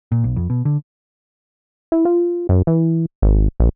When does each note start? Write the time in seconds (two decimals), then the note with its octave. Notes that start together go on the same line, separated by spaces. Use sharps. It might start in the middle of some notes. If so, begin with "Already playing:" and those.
0.12 A#2
0.24 B1
0.36 F2
0.50 B2
0.65 D3
1.92 E4
2.05 F4
2.49 F#2
2.67 E3
3.22 G#1
3.60 A#1